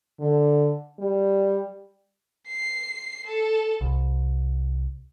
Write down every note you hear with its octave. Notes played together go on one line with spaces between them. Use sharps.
D3
G3
C7
A4
C2